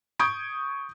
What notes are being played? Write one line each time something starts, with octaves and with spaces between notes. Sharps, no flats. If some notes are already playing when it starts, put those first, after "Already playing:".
C#6 D#6 G6 G#6 D7